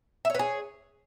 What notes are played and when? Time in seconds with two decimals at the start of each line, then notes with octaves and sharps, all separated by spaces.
0.25 E5
0.30 C#5
0.35 B4
0.39 G#4